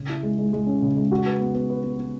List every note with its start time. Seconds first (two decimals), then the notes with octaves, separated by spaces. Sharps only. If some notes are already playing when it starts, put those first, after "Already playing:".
Already playing: C#3
0.09 E4
0.23 G#3
0.38 G#3
0.53 G#3
0.66 C#4
0.82 C#3
0.96 G#3
1.11 F#4
1.26 B4
1.41 B3
1.54 B3
1.70 B4
1.83 B3
1.99 B3